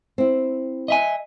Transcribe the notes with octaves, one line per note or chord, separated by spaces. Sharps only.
C4 E4
D#5 E5 G#5